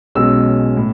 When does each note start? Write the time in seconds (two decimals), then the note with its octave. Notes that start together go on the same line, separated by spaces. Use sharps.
0.15 B1 B2 G#3 C#4 E6
0.77 A2